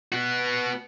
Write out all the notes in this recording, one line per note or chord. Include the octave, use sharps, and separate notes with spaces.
B3 F#4